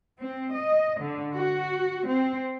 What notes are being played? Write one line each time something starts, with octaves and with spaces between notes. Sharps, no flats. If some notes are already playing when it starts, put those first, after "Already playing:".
C4
D#5
D3
F#4
C4